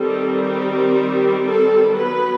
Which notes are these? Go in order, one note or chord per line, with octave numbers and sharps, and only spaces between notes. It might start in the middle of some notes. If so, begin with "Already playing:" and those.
Already playing: D#3 G3 C4 A4
G4
A4
F#3 B3 B4